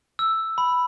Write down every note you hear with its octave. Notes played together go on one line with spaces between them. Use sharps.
E6
B5